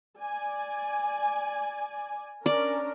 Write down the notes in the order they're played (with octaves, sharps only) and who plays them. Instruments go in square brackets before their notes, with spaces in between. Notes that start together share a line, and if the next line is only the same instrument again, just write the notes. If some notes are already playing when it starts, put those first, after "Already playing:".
[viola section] D5 G#5
[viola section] C#4 D4 A#4 [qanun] D5